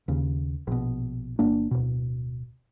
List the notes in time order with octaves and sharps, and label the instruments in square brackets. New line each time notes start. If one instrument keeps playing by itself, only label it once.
[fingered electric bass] D#2 C#3
A#1 B2
G1 A#3 D4
D1 B2